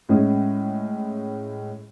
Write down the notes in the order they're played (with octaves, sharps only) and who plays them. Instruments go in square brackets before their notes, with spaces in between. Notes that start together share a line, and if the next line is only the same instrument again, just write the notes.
[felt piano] A2 G#3 C#4 G#4